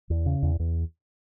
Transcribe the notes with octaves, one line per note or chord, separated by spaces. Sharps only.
E2
C#3
E2
E2